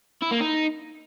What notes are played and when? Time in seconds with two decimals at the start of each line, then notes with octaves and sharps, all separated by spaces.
0.22 E4
0.32 A#3
0.41 D#4